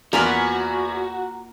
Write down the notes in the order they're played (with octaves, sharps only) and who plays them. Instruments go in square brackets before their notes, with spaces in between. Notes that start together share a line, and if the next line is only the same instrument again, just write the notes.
[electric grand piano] E2 G#5 F6 [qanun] A#3 F4 B4 [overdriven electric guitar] F#4 [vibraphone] A#5